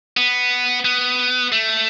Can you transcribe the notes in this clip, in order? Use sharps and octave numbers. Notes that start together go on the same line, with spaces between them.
B3
B3
A3